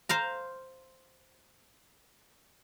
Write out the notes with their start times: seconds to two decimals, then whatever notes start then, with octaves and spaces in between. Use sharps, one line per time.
0.09 C5 F5 A#5